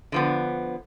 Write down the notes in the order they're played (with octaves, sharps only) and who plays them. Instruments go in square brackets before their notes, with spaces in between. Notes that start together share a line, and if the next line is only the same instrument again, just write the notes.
[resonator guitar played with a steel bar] D3 F3 B3